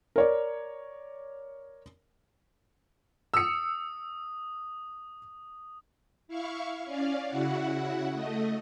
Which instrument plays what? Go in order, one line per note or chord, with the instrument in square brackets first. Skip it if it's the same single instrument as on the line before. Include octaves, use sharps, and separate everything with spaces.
[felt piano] A#4 C#5 D5
[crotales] D#6 [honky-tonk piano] E6 C#7
[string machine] E4 F5 C#6
C#4 D5 F5
C#3 E4 F#4 F#5
A3 D#5